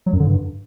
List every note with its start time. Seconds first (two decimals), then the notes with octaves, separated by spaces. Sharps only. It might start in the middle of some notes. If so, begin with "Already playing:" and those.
0.06 F#3
0.13 F#2
0.20 D3
0.26 G2